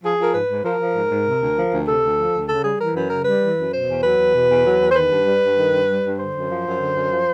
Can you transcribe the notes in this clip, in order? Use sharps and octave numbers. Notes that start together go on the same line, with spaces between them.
F3 G#4
F3 A#4
G#2 B4
G#2
F3 A#4
F3
G#2
G#2
C3
D2
F3
D2
C3 A4
D2
F3
D2
C#3 A4
G3 G#4
E3 A#4
F#2 B4
C#3 A#4
G3 B4
E3
F#2
B2 C5
E2
F#3 B4
E2
B2
E2
F#3
E2
C5
D#3 B4
G2
G3
G2
D#3
G2
G3
G2
D3 C5
F#2
F3
F#2
D3
F#2
F3